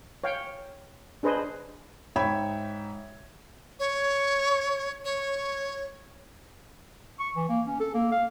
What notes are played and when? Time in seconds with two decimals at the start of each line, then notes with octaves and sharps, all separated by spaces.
0.24 C#5 F5 G5
1.23 D4 G#4 B4 C5 D#5
2.16 G#2 C#5 E5 G5 B5 G#6
3.79 C#5
5.04 C#5
7.19 C#6
7.36 E3
7.49 A#3
7.67 C#4
7.80 A4
7.94 A#3
8.12 F5